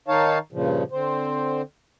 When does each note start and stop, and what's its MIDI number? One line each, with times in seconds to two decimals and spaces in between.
0.08 0.38 51
0.08 0.38 63
0.08 0.38 73
0.08 0.38 77
0.08 0.38 81
0.53 0.83 43
0.53 0.83 46
0.53 0.83 49
0.53 0.83 53
0.92 1.62 50
0.92 1.62 60
0.92 1.62 72